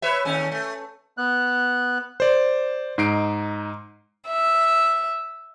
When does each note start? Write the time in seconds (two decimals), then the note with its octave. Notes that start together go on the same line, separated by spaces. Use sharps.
0.02 B4 C#5 E5
0.25 D#2 A3 C#4
0.52 A3
1.18 B3 F#6
2.20 C5 D5
2.98 G#2 D#4 C7 D7
4.28 E5